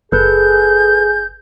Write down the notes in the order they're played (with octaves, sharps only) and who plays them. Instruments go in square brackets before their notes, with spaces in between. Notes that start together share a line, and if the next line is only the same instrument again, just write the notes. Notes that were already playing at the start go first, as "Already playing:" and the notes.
[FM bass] F#1 [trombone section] G#4 [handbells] A4 B4 [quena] G6